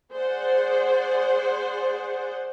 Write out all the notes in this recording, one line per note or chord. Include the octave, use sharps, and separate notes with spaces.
G#4 C5 D5 F#5